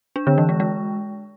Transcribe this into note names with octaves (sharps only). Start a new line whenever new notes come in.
D4
D3
E3
G#3
G#3